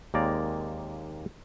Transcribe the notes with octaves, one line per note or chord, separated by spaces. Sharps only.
D#2 G#3 A#3 C4 D5 A#5